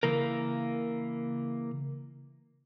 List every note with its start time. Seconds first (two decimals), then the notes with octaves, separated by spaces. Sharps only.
0.03 C#3 E3 A#3 A#4